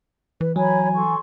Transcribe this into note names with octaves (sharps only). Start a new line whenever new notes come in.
E3 B4
F#3 C#5 G#5 A#5 B5
A4 C6 C#6